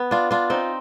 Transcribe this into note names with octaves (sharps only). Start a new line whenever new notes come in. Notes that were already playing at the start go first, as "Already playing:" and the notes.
Already playing: B3
D4 F4
D4 F4
C4 D#4